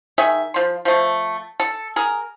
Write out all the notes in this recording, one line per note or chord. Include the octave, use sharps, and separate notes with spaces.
D#3 G#4 E5
F3 C6
F3 A3
A4
G#4 A#4